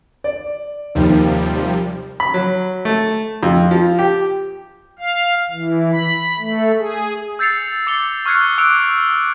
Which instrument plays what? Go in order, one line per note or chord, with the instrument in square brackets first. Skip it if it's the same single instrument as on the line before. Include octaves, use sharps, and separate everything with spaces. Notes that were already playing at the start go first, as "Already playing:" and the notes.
[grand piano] D5
[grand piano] D#2 [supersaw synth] C3 F3 G3
[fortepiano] B5
F#3
A3
F2
F3
G4
[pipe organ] F5
E3
B5
A3
G#4
[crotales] E6 G6 A6 C7 C#7 F7
D6 A6 C7 C#7 F7 G7
C#6 F6 F#6 G#6 C7 C#7
D6 E6 F#6 C#7 D7 F7